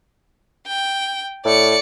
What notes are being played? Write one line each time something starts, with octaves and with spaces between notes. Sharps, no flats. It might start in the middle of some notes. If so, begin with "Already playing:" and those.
G5
A2 D5 C#7